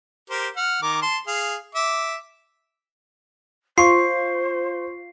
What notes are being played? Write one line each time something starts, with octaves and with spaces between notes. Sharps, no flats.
G4 A#4 C5
F#5 F6
D#3 A#4 D6
A5 C6
G#4 F5
E5 D6
F4 C5 C6 C#6 C7